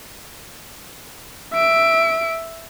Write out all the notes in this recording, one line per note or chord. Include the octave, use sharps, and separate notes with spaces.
E5 D7